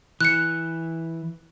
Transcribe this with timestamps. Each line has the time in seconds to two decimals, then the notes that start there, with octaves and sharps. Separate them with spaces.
0.21 E3 F#6 C#7